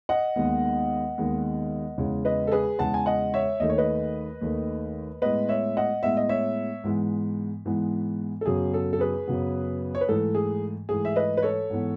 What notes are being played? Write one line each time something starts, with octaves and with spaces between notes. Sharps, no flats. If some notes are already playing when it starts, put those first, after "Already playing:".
D#5 F#5
D#2 D#3 G#3 B3
D#2 D#3 G#3 B3
E2 C#3 G#3
B4 D#5
A4
G#4 B4
E2 C#3 G#3 F#5 A5
G#5
D#5 F#5
C#5 E5
D#2 D#3 A3 D#5
C#5
B4 D#5
D#2 D#3 A3
A2 G#3 B3 B4 D#5
C#5 E5
D#5 F#5
A2 G#3 B3 E5
D#5
C#5 E5
G#2 E3 G#3 B3
G#2 E3 G#3 B3
A4
F#2 C#3 F#3 B3 G#4
A4
A4
G#4 B4
F#2 C#3 F#3 B3
C#5
B4
G#2 E3 A3 A4
G#4
G#2 E3 A3 G#4
E5
B4 D#5
B4
A4 C#5
G#2 E3 B3